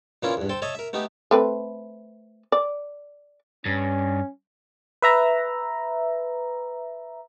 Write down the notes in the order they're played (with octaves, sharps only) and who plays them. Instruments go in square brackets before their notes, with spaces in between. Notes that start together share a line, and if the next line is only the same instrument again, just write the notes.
[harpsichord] A#2 E3 A#3 C#4 E4 F4
E2 G2
A4 C5 G5 A5
A4 C#5 D#5 E5 A5
A#4 E5
A3 B3 D#4 G4
[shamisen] A3 C4 B4
D5
[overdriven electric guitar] G2 [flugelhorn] C#4
[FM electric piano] B4 E5 A#5